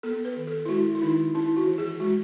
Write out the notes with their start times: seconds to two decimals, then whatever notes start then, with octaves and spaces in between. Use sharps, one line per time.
0.03 B3 A4
0.25 B4
0.37 D#3
0.47 A4
0.65 E4
0.69 G#3 F#4
0.95 E4
1.02 D#3 D#4
1.35 C#4 E4
1.56 F#4
1.67 E3
1.78 G#4
2.00 G#3 F#4